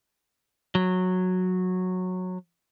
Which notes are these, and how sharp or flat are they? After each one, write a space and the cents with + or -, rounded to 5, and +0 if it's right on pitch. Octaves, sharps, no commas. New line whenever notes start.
F#3 -10